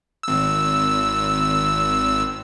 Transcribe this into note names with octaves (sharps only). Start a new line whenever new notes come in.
G#1 E6